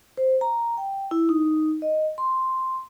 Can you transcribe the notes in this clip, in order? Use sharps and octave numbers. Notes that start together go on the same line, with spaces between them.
C5
A#5
G5
E4
D#4
D#5
C6